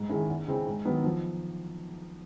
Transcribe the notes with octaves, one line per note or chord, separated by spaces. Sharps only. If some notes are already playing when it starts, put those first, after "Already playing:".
Already playing: G#2
D#3 G#3 C#4 E4
E2
C#3 E3 G#3 C4
G#2
D#3 F#3 B3
F3